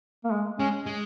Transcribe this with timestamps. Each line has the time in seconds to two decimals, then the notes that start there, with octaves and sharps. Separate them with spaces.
0.24 A#3
0.32 G#3
0.59 G#3 C#4
0.86 G#3